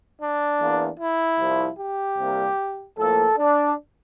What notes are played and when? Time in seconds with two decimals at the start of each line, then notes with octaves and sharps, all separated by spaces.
0.20 D4
0.60 E2 E3 A#3
0.99 E4
1.39 C2 C3 F3
1.79 G4
2.18 C2 C3 G3 A#3
2.98 A2 F3 A#3 A4
3.38 D4